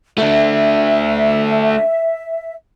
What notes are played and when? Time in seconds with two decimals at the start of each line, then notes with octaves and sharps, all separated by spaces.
0.18 A3 D4 E5